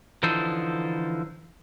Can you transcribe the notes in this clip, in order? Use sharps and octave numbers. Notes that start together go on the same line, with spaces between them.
D3 E3 F3 D#4 A4 C5